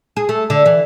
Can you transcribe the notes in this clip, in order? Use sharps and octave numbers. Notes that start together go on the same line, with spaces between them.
G#4
A3
D3
E3